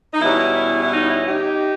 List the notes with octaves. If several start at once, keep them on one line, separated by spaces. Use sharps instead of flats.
D#4
E2 B2 G3 C#4 E4
E4
D#4
E4
D#4 G4